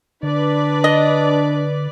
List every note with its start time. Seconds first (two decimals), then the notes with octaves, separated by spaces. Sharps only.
0.23 D3 D4 B4 D5
0.84 D#5